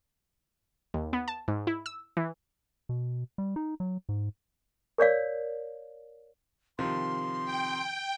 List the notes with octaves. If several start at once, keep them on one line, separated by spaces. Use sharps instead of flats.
D#2
B3
A5
G#2
E4
E6
E3
B2
G3
D#4
F#3
G#2
A#4 C#5 D5 F5
C3 D#3 F3 C6
G5